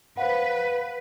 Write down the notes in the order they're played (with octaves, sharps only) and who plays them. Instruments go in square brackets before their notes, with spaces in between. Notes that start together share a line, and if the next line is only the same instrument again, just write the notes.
[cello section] B4 [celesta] C5 F5 F#5